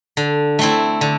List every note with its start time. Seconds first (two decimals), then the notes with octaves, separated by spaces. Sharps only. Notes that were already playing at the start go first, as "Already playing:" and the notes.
0.17 D3
0.59 A3 C4 E4
1.01 D3